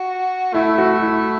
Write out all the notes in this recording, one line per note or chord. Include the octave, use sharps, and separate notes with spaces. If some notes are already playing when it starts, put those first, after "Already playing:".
Already playing: F#4
A3 E4
F#4
E4